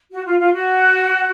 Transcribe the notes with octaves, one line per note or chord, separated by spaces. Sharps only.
F#4
F4
F4
F#4